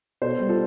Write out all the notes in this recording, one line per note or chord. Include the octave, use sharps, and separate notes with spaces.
B2 A4 C5
G3
F4 A4